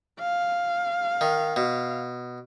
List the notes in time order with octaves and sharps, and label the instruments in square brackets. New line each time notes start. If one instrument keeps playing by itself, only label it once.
[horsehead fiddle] F5
[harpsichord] D#3
B2